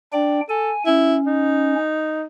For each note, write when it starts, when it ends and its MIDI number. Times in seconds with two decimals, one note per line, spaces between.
0.13 0.41 62
0.13 0.41 74
0.13 0.41 79
0.49 0.72 69
0.49 0.83 80
0.86 1.75 61
0.86 1.17 64
1.26 2.24 63